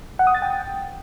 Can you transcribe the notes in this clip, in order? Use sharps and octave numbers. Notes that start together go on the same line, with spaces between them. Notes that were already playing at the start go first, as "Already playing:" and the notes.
F#5
D#6
A6
G5